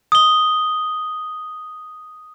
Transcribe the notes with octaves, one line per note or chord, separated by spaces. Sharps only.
D#6 G7